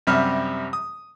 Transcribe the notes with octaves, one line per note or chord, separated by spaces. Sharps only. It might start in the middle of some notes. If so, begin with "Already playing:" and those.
F#2 C3 G3 E5 F6
D#6